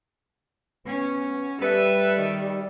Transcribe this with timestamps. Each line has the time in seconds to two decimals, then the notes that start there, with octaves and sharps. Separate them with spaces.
0.87 B3 C#4
1.62 G3 A4 B4 E5
2.16 D#3